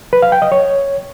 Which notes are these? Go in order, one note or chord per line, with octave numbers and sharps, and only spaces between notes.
B4
F5
G5
D#5
C#5